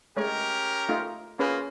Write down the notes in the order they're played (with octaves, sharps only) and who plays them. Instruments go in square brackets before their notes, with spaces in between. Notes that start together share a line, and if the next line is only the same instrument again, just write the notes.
[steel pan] G#3 A3 C#5 [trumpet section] C#4 G4 A#4
[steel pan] A3 D#4 F4
[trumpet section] A#3 F4 [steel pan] C#4 G#4 B4